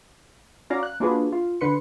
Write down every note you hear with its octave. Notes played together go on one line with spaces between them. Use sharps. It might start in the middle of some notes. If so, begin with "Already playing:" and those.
C#4 F#4 D5 F5 A#5
F#6
A#3 D4 F4 F#4 G#4 B4
F4
D3 B4 C6 C#7